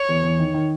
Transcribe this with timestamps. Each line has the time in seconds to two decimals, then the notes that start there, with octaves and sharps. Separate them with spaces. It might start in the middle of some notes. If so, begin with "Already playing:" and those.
Already playing: C#5
0.09 E2
0.23 E2
0.39 D#3
0.54 D#3